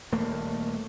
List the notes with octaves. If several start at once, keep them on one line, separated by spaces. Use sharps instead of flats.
D#1 A3 A#3